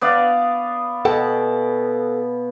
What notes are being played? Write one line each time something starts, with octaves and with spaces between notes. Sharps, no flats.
B3 D5 F5
B2 A4 F#5 G5